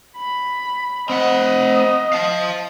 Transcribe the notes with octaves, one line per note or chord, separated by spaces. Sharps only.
B5
C4 D#5 F#5
F5 A5